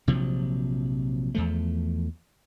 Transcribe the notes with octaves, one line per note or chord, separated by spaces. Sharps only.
A#1 C3 F3 F#3
E2 F3 A3